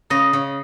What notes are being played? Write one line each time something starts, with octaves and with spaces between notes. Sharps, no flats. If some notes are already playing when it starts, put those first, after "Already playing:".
C#3 D#5
C#3